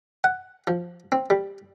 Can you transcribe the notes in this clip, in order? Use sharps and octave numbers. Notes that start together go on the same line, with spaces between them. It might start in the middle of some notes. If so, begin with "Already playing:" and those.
F#5
F3
C4
G3